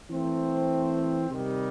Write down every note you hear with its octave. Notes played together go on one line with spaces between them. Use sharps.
E3 A3 C4
C3 D#3 G3